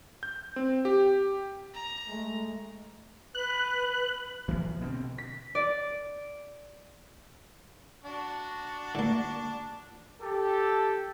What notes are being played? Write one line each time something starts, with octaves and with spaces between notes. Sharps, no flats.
G6
C4
G4
A#5
G#3 A3
B4 F#6
B1 E3 F3 A#3
B2 D3 C4
B6
D5
D4 F#4
D3 A#3
G4 A4